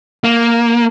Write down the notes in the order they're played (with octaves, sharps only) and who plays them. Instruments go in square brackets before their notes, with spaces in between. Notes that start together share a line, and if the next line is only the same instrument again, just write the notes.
[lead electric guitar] A#3